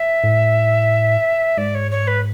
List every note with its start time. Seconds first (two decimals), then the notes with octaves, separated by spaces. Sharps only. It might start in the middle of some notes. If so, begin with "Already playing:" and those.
Already playing: E5
0.24 A2
1.57 G#2 D5
1.75 C#5
1.91 C#5
2.07 B4